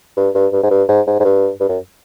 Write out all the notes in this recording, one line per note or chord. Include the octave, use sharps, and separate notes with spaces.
G2
G2
G2
G#2
G2
G#2
G#2
G#2
G2
G2
F#2